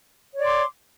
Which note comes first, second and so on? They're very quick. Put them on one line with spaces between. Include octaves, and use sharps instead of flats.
C#5 D5 C6 D6